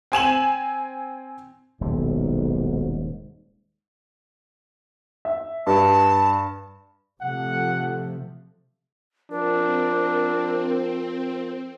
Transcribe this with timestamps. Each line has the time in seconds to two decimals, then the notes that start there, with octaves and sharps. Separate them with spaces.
0.12 C4 G#5 E7 F#7
1.81 D#1 B1 G#2 C3
5.25 E5
5.67 G2 A5
7.21 C3 F3 A3 F#5
9.31 F3 C4 D4 A#4